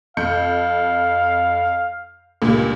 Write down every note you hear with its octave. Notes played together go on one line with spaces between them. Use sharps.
F2 F5 G6 C#7
C#2 G2 A#2